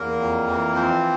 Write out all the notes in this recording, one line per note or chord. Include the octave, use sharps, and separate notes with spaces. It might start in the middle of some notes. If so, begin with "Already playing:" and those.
Already playing: E2 A#3 A#4
F2
E3
F3 C4 C5